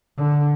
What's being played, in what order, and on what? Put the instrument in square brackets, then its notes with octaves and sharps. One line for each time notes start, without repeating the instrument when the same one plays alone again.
[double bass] D3